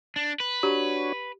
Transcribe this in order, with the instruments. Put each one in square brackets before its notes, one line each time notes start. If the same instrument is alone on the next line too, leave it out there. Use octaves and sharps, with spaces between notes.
[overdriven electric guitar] D4
B4
[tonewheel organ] D4 F#4 C#5 [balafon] G4